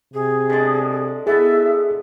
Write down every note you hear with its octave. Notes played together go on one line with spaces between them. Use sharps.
C3 G#4
D3 G#3
B3 E4 G#4 E5